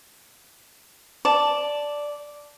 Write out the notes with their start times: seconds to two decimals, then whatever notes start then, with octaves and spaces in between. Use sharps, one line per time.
1.25 D5 A5